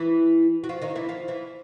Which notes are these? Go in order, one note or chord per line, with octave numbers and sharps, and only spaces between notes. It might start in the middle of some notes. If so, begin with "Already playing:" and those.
Already playing: E3 E4
F#4
F3 F4
D#3 D#4
E3 E4
F3 F4
E3 E4